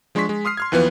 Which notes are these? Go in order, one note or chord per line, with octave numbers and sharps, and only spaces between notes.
F3 G#3 D4 C6 C#6 B6
G#3
C6 D#6 F6 C7
C6 F6 G#6
D#2 E3 F3 B3 B4